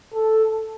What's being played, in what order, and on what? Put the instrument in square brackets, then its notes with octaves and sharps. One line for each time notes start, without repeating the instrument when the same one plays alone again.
[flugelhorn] A4